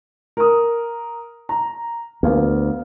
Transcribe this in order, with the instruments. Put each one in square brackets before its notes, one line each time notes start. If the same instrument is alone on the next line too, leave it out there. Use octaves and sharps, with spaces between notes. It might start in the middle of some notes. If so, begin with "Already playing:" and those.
[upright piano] A#4 D#6
A#5
[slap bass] D2 [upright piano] B3 A#4 F5